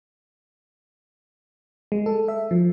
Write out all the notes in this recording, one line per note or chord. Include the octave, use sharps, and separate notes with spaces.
G#3
A4
E5
F3